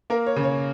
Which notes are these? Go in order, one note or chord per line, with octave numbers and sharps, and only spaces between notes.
A#3 A#4
C#5
C#3
C#5